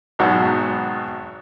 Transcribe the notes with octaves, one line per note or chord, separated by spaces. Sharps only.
G#1 G#2 B2 F#3